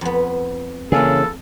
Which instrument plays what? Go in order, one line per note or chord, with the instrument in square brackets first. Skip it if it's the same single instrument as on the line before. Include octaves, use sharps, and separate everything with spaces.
[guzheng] F2 B3
[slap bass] C#3 [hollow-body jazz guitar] E3 A#3 G#4 [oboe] A4